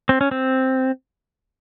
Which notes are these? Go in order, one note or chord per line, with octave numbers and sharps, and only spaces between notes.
C4
C#4
C4